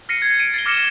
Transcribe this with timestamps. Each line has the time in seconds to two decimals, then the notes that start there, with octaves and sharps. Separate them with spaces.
0.09 F6 A#6 C7 C#7 D#7
0.22 G#6 C7
0.40 D7 D#7
0.54 A6 C7 G7
0.66 D6 F6 A#6 C#7 E7 G7